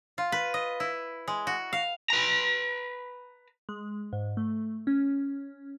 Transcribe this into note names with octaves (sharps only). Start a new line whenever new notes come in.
F4
B4
D#5
E4
G#3
F#4
F5
B4 A#5
G#3
G#2
A3
C#4